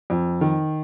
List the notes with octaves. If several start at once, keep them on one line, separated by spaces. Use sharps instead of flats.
F2
D#3